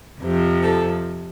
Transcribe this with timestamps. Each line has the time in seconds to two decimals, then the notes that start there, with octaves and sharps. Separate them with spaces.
0.21 F2 C3 F3
0.63 A4